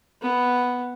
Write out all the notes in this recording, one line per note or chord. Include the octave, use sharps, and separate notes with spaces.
B3